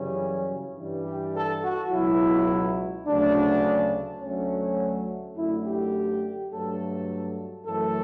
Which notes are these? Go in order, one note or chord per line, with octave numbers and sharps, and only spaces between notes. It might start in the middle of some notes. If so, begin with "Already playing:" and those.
Already playing: F#2 C#3 E3 G3 C#4
G2 E3 G3
G4
A4
F#4
C#2 B2 F#3 E4
D2 C#3 F#3 A3 D4
D2 D3 F#3 A3 C#4
F#2 D3 A3 E4
G4
G2 F#3 A3 A4
F#2 E3 A3 A4